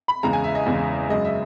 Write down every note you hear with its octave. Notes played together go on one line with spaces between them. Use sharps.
B5
E2 C#3 G#3 A#5
G#5
E5
D#5
E2 C#3 G#3
F#2 C#3 G#3 D#5
E5